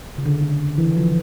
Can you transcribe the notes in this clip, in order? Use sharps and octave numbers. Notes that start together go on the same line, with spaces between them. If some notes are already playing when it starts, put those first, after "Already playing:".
C#3
D3
D3
E3
F3